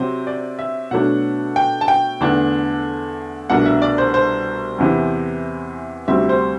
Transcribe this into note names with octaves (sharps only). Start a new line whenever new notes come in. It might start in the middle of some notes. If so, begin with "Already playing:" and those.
Already playing: C3 F#3 C4 C5
D5
E5
B2 F#3 A3 D4 F#5
G5
A5
G5
E2 D3 A3 D4
C2 B2 A3 D4 F#5
E5
D5
C5
C5
E2 C3 E3
D2 C3 G3 C4 E5
C5